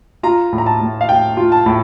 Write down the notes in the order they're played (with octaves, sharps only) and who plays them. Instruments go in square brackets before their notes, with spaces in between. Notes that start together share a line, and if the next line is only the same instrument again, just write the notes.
[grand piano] F4 A#5
A2
A#5
A5
A2
F5
A2 G5
F4
A5
A2